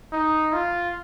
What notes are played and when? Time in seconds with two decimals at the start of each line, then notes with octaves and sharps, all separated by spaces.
0.13 D#4
0.53 F4